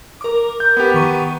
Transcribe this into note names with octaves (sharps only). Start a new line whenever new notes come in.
A#4 D6
G6
B3 G4
D#3 C#6 D#7